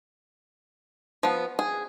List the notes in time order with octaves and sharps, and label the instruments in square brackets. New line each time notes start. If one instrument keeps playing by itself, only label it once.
[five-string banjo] F3 B3
G#4